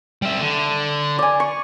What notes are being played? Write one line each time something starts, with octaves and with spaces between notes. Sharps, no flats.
G3 E5
D3
D5 G#5
C#6